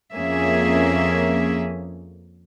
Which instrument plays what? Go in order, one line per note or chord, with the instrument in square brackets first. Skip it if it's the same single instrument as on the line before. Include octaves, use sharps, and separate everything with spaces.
[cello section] F2 A#3 C#4 G#4 E5